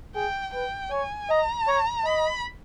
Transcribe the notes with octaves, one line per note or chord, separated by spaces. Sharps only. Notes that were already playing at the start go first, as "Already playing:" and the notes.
G#4 G5
B4 G5
C#5 G#5
D#5 A#5
C#5
D#5 B5